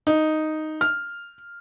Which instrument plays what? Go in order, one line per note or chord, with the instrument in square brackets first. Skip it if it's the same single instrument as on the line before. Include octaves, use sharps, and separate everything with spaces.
[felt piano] D#4
F6